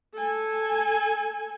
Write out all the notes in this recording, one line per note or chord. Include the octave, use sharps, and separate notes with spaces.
A4 G#5